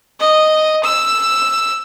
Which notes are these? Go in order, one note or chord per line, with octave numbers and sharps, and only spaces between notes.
D#5
E6